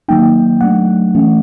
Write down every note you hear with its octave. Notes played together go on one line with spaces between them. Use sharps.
D#3 F#3 A#3 D#4 G5
F#3 A3 D4 F#5
E3 A3 C#4